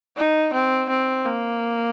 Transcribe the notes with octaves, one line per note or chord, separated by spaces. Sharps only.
D#4
C4
C4
A#3